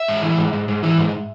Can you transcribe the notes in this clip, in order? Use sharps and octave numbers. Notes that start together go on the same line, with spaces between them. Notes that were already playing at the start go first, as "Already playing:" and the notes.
Already playing: E5
G#2
E3
G#2
G#2
G#2
E3
G#2